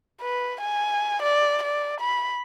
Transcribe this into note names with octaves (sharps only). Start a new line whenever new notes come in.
B4
G#5
D5
D5
B5